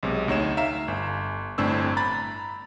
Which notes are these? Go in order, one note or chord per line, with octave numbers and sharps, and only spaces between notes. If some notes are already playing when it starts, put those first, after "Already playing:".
B1 C3 G#3
D2 D#4 C#5 E7
E5 F5 A#5 E7
G1
G1 A2 C4 D4 E6
A#5 B5 A6